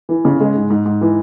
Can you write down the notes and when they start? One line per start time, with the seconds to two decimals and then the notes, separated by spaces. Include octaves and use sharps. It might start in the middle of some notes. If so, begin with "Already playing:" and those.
0.09 E3
0.25 C#3
0.40 G#3
0.56 G#2
0.70 G#2
0.86 G#2
1.01 E3